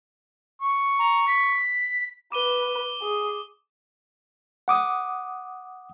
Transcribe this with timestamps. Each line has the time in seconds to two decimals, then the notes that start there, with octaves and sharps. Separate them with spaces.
0.62 C#6
0.99 A#5
1.27 B6
2.32 B4 D6 D#7 G7
3.01 G#4
4.68 F#5 D6 D#6